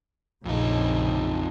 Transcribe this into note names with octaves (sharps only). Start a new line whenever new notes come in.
A#1 F2 C#3 D#4